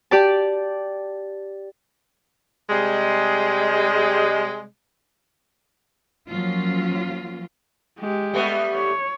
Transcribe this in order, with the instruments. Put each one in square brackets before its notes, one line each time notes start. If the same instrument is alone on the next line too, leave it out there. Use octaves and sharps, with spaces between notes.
[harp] G4 D5 A5
[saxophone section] C3 G3 G#3
[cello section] F3 F#3 A#3 C#4 F4
[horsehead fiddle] G#3 G4
[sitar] G3 A3 B3
[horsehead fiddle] C#5